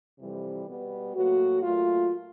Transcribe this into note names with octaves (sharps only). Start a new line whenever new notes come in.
F2 C3 E3 G3
B2 G3 B3
A2 F#3 A#3 F#4
A#2 F#3 A3 F4